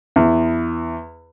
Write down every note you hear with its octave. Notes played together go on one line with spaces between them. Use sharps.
E2